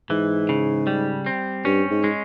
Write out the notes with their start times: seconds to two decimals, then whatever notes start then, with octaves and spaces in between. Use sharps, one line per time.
0.10 G#2 E3
0.49 C#3
0.87 G3
1.26 C4
1.65 G2 C#4
1.91 G#2
2.04 G#3